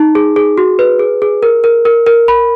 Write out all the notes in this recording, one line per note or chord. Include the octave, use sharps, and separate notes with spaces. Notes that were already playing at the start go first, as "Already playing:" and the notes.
Already playing: D#4
G#4
G#4
F#4
B4
G#4
G#4
A#4
A#4
A#4
A#4
B5